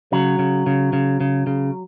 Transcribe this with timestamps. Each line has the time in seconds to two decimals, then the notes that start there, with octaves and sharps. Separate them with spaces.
0.12 C#3 F#3
0.39 C#3
0.66 C#3
0.93 C#3
1.21 C#3
1.47 C#3